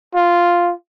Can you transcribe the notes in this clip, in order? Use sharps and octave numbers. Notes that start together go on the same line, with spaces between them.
F4